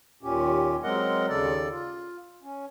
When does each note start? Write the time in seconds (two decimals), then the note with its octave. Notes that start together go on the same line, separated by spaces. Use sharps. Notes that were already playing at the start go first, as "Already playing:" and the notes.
0.23 D#2 A#2 C#4 G4
0.83 F#3 G#3 C4 A#4 D#5 F#5
1.29 D#2 C#3 A4 D5
1.70 F4
2.43 C#4